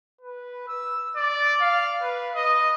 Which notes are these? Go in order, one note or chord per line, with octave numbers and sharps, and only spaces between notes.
B4
E6
D5
F5
B4
D#5